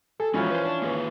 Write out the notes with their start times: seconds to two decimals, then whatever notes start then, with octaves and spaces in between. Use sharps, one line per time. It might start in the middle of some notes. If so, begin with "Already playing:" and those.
0.20 G#4 A4
0.34 E3 F3 G#3 C#4 F#4
0.50 B4 C5
0.65 D4
0.82 A#3 G#4 B4